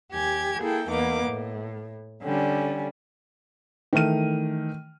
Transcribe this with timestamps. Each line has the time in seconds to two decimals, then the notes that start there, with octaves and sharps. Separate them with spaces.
0.13 D#2 G4 G#5 G#6
0.60 A#3 E4 G#4 A4 G5
0.90 E2 A#3 B3 D#4 D6
1.27 A2
2.23 D3 G3 C#4
3.93 D#3 E3 A3 F6 D#7